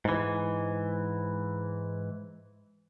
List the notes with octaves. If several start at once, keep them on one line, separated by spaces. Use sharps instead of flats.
G#2 E3